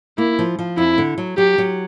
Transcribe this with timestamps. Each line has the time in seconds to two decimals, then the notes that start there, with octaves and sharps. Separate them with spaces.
0.18 A#3 E4
0.39 F3
0.59 F3
0.78 F2 E4
0.98 D3
1.18 F#3
1.38 F#3 G4
1.58 F#3